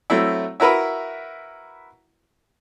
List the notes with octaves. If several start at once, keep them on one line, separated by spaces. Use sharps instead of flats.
F#3 A3 C4 E4
E4 F#4 A#4 B4 E5